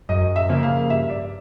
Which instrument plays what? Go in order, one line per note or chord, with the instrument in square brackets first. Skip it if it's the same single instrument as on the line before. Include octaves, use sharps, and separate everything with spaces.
[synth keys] F#2 [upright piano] D#5
[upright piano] E5
[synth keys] C#3 F3 A#3
[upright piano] F5
[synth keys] G2 [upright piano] E5
[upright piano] D5